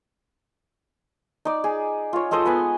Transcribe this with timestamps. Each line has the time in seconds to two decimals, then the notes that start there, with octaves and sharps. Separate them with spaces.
1.45 D#4 D5
1.64 G#4
2.13 F4 C#5
2.31 G#3 A4 C5 D#5
2.45 B3 B4 F#5 G#5